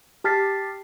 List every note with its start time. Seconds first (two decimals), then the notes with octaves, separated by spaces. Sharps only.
0.24 G4 A5 F6 A6 B6 C7